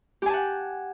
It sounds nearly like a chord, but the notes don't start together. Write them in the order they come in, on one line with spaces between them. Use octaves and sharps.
G4 G#5 A5 F#5